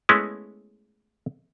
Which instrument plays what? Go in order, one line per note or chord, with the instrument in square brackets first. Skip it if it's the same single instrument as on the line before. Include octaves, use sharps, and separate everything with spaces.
[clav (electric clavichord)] G#3 A3 B3 C#4 E4